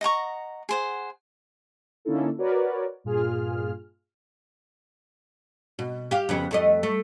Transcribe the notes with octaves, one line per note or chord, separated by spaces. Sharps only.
D#5 F#5 A#5 C#6
G#4 C5 F#5
D3 A#3 C#4 D#4 E4 A4
F#4 A#4 B4 C#5 D5
G2 A#2 F4 G#4 F6
B2
G4 F5
F2 C#3 B3
F2 A3 D#5
A3